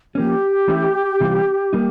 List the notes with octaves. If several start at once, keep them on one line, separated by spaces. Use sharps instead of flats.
F3 A#3 C#4 G4
E3 A3 C#4 E4
C3 E3 G3 C4 F4
G3 A#3 D#4